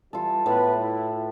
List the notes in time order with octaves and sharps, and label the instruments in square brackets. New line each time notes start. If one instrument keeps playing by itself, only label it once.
[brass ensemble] E3 G3 [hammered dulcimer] F4 A4
[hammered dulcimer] A2 [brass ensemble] B3 B4
[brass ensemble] E4